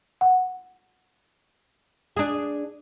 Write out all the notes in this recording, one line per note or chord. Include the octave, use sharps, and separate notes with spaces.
F#5
D4 G#4